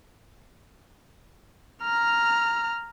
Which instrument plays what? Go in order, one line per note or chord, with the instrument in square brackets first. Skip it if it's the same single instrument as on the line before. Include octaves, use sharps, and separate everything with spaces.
[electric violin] A#5 F6